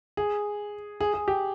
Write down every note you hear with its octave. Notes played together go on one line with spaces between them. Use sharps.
G#4
G#4
G#4
G4